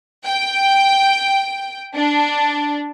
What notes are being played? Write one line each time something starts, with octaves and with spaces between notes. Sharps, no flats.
G5
D4